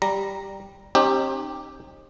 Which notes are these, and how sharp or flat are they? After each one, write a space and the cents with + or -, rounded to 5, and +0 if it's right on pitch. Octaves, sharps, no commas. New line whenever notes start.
G3 +0 A#5 +0
C4 +40 D#4 -30 G4 +0